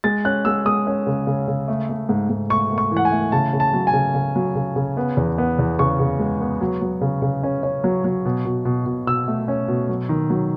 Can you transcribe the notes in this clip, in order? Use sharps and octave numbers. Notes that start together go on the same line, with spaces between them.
G#3 A6
C#4 F#6
G#3 E6
G#3 D#6
C#4
C#3
C#3
C#3
A3
A3
G#2
G#2
A3 C#6
A3
C#6
E3
F#5
G#5
A3
C#3 A5
C#3
A5
F#3
G#5
C#3
C#3
F#3
C#3
C#3
B3
E2
B3
E2
C#3 C#6
C#3
G#3
B3
F#3
F#3
C#3
C#3
C#4
C#4
F#3
F#3
B2
B2
B2
B2
B2 E6
A3
C#4
B2
F#3
D#3
F#3